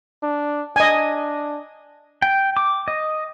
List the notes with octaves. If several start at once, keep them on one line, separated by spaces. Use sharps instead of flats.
D4
D4 D#5 G#5
G5
D6
D#5